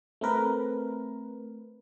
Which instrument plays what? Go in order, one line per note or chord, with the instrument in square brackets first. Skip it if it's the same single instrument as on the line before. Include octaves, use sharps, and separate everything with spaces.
[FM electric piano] A3 C4 A#4 B4